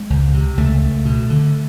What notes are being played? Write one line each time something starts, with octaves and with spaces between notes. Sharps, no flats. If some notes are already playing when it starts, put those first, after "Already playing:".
Already playing: G#3
C#2
C3
C#2 A3
C#2
B2
D3